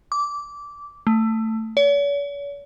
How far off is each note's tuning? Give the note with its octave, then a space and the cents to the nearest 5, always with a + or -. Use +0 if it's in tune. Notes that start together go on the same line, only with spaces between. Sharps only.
D6 -15
A3 +15
C#5 +45